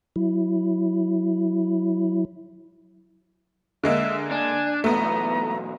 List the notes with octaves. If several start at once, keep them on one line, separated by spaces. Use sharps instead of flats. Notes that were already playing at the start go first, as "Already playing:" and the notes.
F#3 E4
D3 G#3 A#3 E5
D4 G#5
B1 E2 A3 B3 A#5